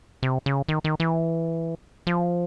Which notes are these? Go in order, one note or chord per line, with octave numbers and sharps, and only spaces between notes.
C3
C#3
D#3
D#3
E3
F3